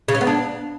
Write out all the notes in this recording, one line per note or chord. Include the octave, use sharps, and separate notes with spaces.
C#3
C#4
B3
D4